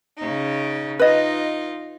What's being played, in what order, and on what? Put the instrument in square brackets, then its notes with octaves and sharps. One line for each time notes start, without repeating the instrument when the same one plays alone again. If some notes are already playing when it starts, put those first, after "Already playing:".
[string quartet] C#3 D#4
[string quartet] D#4 F4 [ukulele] B4 D#5